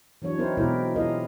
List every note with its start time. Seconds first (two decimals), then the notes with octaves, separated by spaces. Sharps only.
0.22 E3 F#3 D4 C#5
0.38 C4 D#4 E4 A#4 C5
0.57 B2 E3 G#3 E4 G4 A#4
0.96 E4 F4 G#4 A#4 D#5 F5